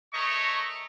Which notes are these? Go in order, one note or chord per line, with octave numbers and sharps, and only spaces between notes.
A3 A#4 C#5 D#5 C#6